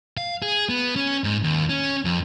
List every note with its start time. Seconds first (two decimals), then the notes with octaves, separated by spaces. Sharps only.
0.17 F5
0.42 G#4
0.69 B3
0.96 C#4
1.24 G#2
1.44 D#2
1.69 C#4
2.05 F2